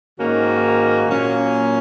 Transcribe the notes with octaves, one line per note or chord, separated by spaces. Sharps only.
G#2 D#3 A#3 C#4 F#4
A#2 F#3 A#3 C#4